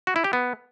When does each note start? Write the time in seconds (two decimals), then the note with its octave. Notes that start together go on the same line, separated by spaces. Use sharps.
0.07 F#4
0.16 E4
0.24 G4
0.33 B3